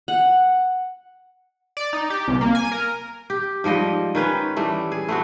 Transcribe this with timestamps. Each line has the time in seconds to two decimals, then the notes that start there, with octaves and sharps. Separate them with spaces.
0.08 F#5
1.77 D5
1.93 D#4
2.10 G4
2.28 C2
2.41 A#3
2.55 G#5
2.72 A#4
3.30 G4
3.64 G#2 F3 G3 D#5
4.15 D#3 C#4 B4 C5
4.56 E3 G3 A3
4.92 G#4
5.08 A3 B3 C4 F#4